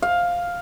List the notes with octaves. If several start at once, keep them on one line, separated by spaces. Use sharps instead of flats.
F5